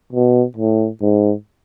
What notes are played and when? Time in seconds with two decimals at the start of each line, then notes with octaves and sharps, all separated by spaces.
0.13 B2
0.57 A2
1.02 G#2